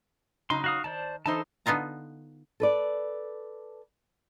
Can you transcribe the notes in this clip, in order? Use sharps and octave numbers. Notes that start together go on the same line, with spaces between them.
C#3 F#3 D#4 C6
F#4 F5 D#6
D#3 C5 D5 A5
E3 D#4 A4 C5 A5
D3 B3 D#4 F4 A#5
A4 B4 D5